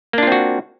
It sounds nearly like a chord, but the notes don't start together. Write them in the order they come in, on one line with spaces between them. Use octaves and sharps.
A#3 D4 F4 C4 F#4